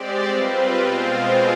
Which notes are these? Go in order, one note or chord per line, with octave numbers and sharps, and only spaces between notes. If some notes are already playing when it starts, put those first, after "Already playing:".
Already playing: G#3 C4 G4 D5
G3 C4 F4 B4
B2 G#3 C4 F4